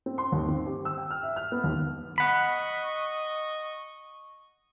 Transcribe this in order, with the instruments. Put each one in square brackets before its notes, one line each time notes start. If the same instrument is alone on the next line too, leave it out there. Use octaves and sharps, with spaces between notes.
[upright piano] C4
C6
D#2
C4
G4
E6
G5
F6
E5
F6
B3
D#2
[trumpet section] D#5 C#6 [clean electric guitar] F#5 B5